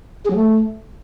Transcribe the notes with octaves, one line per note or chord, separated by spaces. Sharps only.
G#4
F#3
A3